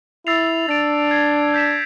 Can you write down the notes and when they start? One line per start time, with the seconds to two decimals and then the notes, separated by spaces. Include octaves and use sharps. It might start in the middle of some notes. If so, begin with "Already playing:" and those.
0.27 E4 E6 A6 C7 F7
0.68 D4 A6 D7 F7
1.11 G#6 C7 F7
1.54 G6 B6 E7